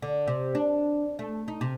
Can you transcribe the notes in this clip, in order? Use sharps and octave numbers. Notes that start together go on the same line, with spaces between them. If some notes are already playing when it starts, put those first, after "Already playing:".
D3
C3
D4
A3
D#4
C3